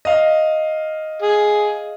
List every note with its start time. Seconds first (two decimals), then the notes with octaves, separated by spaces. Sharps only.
0.05 D#5 F5
1.22 G#4